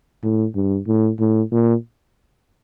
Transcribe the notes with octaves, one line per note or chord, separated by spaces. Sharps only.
A2
G2
A2
A2
A#2